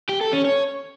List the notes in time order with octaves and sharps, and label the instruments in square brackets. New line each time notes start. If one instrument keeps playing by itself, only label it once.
[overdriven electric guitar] G4
A4
C#4
C#5